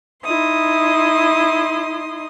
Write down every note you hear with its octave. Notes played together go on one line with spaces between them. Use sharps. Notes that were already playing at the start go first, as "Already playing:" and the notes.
D#4 E4 C6 D#6